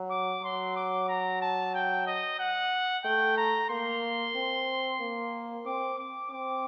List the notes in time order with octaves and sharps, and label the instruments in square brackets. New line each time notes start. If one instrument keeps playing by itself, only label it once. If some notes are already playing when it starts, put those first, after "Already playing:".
Already playing: [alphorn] F#3
[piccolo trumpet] D6
[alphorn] F#3 [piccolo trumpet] C6
[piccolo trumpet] D6
A#5
A5
G5
D#5
F#5
[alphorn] A3 [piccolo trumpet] G5
[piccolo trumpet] A#5
[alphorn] A#3 [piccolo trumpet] C6
[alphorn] C4
A#3
[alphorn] C4 [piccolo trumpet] D6
[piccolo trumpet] D6
[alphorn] C4 [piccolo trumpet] D6